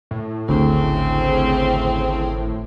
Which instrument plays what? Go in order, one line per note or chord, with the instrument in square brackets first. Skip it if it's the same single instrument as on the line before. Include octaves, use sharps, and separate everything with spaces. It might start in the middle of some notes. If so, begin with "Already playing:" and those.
[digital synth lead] A2
[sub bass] G#1 [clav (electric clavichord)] D2 [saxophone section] C#3 C4